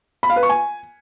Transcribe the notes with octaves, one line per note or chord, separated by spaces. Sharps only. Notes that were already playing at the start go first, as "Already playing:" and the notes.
B5
F5
B4
C#6
G#5